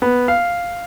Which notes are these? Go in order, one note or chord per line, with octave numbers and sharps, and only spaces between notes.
B3
F5